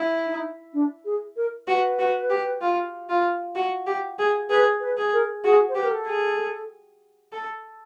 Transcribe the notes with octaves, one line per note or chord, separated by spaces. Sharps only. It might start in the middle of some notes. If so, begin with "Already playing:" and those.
Already playing: E4
D#4
D4
G#4
A#4
F#4 B4
F#4
G4
F4
F4
F#4
G4
G#4
G#4 B4
B4
G#4
A#4
F#4 G#4
C5
G4 B4
A#4
A4
G#4
A4